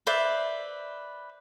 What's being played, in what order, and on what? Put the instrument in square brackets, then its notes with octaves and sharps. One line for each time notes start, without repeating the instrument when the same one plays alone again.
[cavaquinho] B4 C5 D5 E5